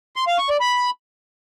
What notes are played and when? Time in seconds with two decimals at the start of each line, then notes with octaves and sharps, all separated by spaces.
0.16 C6
0.27 F5
0.38 C#6
0.49 D5
0.60 B5